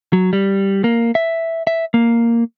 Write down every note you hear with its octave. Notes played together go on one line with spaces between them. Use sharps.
F#3
G3
A#3
E5
E5
A#3